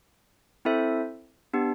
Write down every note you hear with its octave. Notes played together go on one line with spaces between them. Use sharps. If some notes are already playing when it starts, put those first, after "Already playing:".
C4 E4 A4 C5 E5
B3 D4 G4